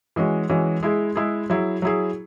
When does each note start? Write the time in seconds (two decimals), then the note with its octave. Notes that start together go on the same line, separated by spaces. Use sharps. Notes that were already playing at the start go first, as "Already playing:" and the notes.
0.16 E3 G#3 C#4 F#4
0.49 E3 G#3 C#4 F#4
0.83 G#3 E4 G#4
1.16 G#3 E4 G#4
1.50 F#3 E4 G#4
1.82 F#3 E4 G#4